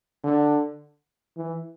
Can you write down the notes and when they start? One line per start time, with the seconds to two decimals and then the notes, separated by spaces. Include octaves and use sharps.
0.24 D3
1.37 E3